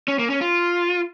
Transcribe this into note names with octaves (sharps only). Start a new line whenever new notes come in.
C#4
A#3
C#4
F4